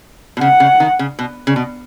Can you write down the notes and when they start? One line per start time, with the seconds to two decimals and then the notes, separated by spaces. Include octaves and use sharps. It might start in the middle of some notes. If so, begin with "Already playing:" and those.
0.37 B2
0.41 C#3 F#5
0.60 C#3
0.80 D#3
0.99 C#3
1.19 B2
1.47 C#3
1.56 B2